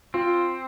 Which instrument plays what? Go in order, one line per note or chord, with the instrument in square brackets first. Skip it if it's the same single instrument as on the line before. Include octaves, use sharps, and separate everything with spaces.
[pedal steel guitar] C4 [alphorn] F4